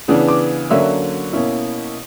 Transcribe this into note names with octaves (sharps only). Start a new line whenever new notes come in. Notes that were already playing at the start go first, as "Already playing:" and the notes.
C#3 E3 B3 D4
D6
D3 F#3 A#3 C#4 E5
B2 A#3 C#4 E4